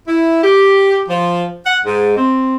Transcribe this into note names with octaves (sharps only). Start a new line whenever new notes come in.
E4
G4
F3
F#5
G#2
C4